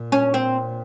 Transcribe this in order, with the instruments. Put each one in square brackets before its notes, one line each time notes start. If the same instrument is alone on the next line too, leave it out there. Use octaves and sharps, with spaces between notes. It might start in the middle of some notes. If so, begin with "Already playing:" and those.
Already playing: [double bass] A#2
[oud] C#4
C4